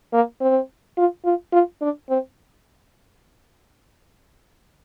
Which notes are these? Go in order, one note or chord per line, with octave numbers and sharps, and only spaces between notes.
A#3
C4
F4
F4
F4
D4
C4